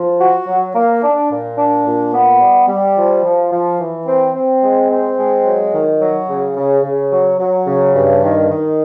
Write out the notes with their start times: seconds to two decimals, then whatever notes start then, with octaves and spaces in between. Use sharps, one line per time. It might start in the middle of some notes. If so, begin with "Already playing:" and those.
Already playing: F3
0.19 F#4
0.47 F#3
0.74 A#3
1.02 D4
1.31 A#2
1.58 D4
1.86 A#2
2.13 B3
2.40 G3
2.68 G3
2.96 F3
3.24 F3
3.52 F3
3.80 E3
4.07 C4
4.35 C4
4.63 G#3
4.91 C4
5.18 G#3
5.45 F#3
5.74 D#3
6.01 F#3
6.29 C#3
6.56 C#3
6.84 C#3
7.12 F#3
7.39 F#3
7.67 C#3
7.94 G2
8.23 D#3
8.50 D#3